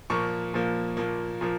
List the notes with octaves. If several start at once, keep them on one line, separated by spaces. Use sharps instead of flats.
A#2 F3 A#3 C#6
A#2 F3 A#3
A#2 F3 A#3
A#2 F3 A#3